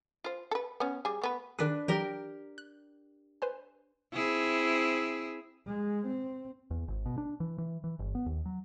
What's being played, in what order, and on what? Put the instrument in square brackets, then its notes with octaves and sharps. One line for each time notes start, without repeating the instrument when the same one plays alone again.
[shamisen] F4 C5
A4 B4
B3 C#4
G3 G#4
A3 B3 B4
[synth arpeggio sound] D#3 G#4 [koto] D4 B4
[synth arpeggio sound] E3 F#3 [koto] G4 A#4 G5
[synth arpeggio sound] F#6
B4 C5 G#5
[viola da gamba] C4 E4 G#4
[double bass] G#3
C4
[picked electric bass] E2
G#1
B2
D4
E3
E3
E3
G1
B3
D#2
F#3